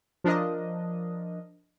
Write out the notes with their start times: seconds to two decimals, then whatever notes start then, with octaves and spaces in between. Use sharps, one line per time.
0.24 F3 D4 A#4 D#5